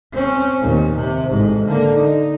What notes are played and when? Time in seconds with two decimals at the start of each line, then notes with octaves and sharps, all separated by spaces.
0.12 C4 C#4
0.61 D#2 A#2
0.95 C3
1.29 A1 G#2
1.66 D3 A#3
1.94 D#4